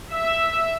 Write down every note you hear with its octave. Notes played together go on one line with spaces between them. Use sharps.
E5